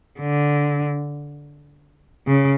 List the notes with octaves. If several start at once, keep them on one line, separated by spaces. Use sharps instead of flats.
D3
C#3